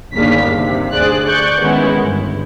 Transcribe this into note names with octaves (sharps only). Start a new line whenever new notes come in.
G1 D#2 C#3 D4 F5 B6
C3
D2 G#4 C5 D5 F#6
D5 C#6 F#6 G6
D#3 G#3 B3 C#4 E4
G1